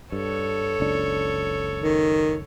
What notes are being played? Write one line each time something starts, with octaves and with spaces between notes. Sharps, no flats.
G2 A4 C#5
F#1 C#2 D4
D#3